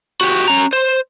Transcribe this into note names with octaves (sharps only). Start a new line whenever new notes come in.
F#4 G4
C#4 A#5
C5